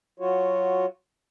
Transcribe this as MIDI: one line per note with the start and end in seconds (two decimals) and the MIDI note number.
0.19 0.86 54
0.19 0.86 65
0.19 0.86 66
0.19 0.86 73